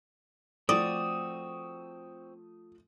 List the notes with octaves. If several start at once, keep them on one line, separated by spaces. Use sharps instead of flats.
F3 A3 C4 F#4 D5 D#6